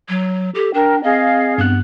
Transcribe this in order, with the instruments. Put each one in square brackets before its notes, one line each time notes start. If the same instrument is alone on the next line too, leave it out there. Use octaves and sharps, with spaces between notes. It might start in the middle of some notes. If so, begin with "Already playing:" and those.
[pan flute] F#3
[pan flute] G4 [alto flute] A4
[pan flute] D4 [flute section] A#4 [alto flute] G5
[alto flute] C4 [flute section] G#4 F5 [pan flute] D#5
[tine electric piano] G2 F#6 [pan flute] B3